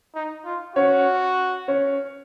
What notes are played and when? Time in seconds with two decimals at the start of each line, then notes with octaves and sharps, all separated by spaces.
0.15 D#4
0.45 F4
0.75 C#4 F#4 C#5
1.68 C#4 C#5